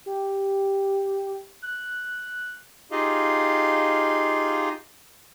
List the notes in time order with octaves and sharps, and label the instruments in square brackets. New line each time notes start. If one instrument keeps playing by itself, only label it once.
[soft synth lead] G4
F#6
[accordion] D#4 F4 G4 G#4 D#5 F5